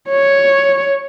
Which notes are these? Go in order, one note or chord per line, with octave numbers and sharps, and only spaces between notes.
C#5